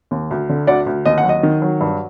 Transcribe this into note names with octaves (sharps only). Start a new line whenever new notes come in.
D#2
D2
D3
D2 D5 F#5
D2
D#2 D#5
F#5
F#3
D#5
D#3
F#3
G2